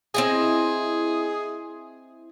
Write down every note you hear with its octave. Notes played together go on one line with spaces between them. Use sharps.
C4 E4 G#4 D#5